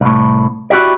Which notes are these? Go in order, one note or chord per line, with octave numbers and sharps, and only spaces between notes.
C2 A2
E4 F#4 G4 D5